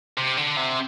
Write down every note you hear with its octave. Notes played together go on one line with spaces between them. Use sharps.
C3
D3
C3